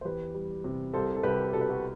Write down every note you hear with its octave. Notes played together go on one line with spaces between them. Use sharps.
C5
E2 G4 B4
G3
C3
C2 A4 C5
A4
C2 G4 B4
B2 A4
B4
F#4 A4